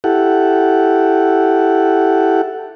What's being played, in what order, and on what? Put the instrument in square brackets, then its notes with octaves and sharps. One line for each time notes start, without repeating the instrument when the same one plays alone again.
[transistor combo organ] E4 G4 A4 F#5